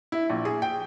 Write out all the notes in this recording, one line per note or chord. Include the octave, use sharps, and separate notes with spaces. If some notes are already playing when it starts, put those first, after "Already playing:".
E4
A#1
G#4
G5